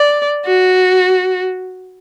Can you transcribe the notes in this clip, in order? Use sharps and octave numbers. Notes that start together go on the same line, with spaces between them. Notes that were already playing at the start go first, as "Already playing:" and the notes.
Already playing: D5
F#4